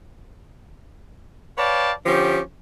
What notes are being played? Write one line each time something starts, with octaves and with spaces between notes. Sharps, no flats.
B4 C#5 D5 F5 G5 A5
D3 F3 C#4 G4